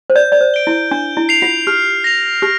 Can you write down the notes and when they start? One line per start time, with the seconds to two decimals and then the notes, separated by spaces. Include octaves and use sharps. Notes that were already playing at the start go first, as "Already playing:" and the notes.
0.10 C5
0.15 D5 G6
0.32 D5
0.41 C5
0.54 D7 G7
0.67 E4
0.91 D4 G6
1.17 E4
1.29 C7 F7
1.42 F4
1.67 G4 F6
2.04 A#6 F7
2.42 G4 F6